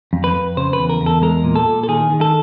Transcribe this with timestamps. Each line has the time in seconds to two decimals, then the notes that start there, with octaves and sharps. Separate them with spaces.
0.13 F2
0.24 B4
0.35 F2
0.57 C#3 C5
0.73 B4
0.79 E2
0.89 A#4
1.01 E2
1.06 A4
1.22 G#3 A#4
1.44 A#2
1.56 A4
1.67 A#2
1.83 A4
1.88 D#3 G#4
2.10 D#3
2.21 A4